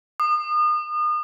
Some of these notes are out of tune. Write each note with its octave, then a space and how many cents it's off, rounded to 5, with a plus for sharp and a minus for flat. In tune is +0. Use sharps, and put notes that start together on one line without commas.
D#6 -35